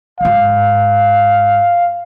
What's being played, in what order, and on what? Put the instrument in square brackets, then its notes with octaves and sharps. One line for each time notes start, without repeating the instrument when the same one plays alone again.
[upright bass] G1 G#2 [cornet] F5